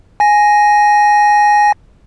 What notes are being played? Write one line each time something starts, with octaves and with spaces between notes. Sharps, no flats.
G#5 A#6